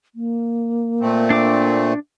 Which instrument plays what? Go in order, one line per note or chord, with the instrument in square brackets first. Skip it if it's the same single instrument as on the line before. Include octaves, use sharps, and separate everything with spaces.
[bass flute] A#3
[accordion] A#2 A3 C4
[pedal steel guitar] D4 D6